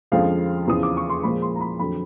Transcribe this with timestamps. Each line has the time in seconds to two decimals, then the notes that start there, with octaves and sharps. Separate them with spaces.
0.12 F2 D3 F3 G#3 C#4 F5
0.67 E2 C#3 F3 D#6
0.83 D6
0.97 C#6
1.10 C6
1.23 A#2 F3 G#3 B5
1.42 C6
1.56 A#5
1.61 B5
1.80 F2 D3 F#3 B5